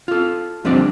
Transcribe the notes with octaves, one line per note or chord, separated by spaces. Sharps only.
F4 A4
D2 F3 G3 C4 D4 D5